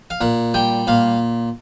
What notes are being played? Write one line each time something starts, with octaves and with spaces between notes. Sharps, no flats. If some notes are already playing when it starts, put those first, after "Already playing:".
F5
A#2 F#5
G3 G5
A#2 F5